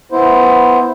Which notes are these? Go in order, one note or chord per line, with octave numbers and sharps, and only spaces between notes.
B3 E4 C5